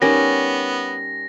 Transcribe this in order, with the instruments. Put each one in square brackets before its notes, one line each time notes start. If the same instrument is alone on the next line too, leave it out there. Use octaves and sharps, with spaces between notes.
[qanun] G3 C#4 [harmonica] B3 [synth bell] D#4 A#4 [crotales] A#6